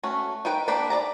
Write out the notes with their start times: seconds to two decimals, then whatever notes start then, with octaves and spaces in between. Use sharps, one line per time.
0.04 A3 C#4 F#4
0.45 D#4 A#4 B4 G5
0.68 A#3 D4 G4 A5 B5
0.90 D5 D#5 A5 A#5